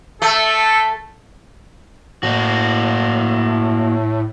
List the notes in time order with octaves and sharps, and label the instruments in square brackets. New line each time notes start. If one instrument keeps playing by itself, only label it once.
[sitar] A3 [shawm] A4
[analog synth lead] A2 [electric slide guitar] A#3 F#4